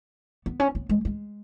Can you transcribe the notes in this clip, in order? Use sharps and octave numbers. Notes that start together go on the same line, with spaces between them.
B3
C#4
B3
G#3
G#3